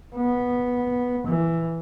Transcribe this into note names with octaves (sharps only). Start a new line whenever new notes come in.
B3
E3